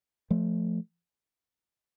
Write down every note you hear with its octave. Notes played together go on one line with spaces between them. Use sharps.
F3 A3